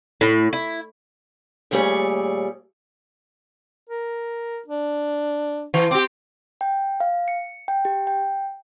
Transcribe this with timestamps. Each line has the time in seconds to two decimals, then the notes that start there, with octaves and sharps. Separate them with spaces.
0.21 A2
0.53 E4
1.71 D#2 A#2 G3 A3 G#4 C#5
3.90 A#4
4.68 D4
5.74 E3
5.91 C4 G4 D6
6.61 G5
7.00 F5
7.28 C#7
7.68 G5
7.85 G4
8.07 G5